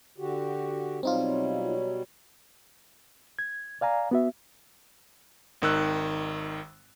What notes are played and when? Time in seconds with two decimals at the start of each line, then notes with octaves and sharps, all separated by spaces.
0.18 D3 F#4 G4
1.03 B2 F#3 G3 C4 D#4 F4
3.39 G#6
3.81 D5 F5 G#5 A#5
4.11 B3 F#4 E5
5.62 G#1 D#3 E6 F#6